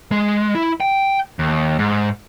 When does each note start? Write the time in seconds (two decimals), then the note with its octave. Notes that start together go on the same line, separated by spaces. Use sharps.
0.12 G#3
0.55 E4
0.80 G5
1.39 D#2
1.79 G#2